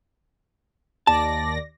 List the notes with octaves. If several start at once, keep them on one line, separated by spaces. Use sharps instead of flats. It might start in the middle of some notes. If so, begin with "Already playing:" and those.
D#2 D5 A5 A#6